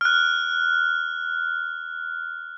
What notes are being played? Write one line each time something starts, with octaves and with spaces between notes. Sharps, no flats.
F6 F#6